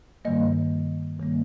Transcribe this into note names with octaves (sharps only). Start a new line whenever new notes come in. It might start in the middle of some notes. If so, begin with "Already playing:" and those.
G2 D#3 G3 A#3 D#5
G2 D#3 G3 A#3